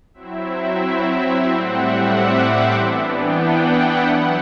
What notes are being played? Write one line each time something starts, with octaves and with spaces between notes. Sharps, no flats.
F#3 C4 E4 E5
A2 G3 C4 F#5
E5
D6
C6
E3 B3 D4
G5
F#5
E5
F#3 B3 E4 F#5